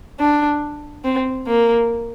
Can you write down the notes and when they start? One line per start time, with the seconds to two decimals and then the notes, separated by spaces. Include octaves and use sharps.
0.20 D4
1.04 C4
1.47 A#3